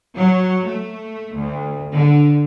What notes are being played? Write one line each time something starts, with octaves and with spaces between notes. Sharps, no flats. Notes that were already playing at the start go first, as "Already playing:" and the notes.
F#3
A3
D2
D3